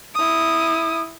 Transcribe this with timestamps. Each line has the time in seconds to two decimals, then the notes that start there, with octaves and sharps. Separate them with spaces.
0.15 E4 D#6